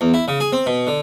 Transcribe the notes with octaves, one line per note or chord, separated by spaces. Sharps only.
E2
E4
C#3
G#4
C4
B2
D3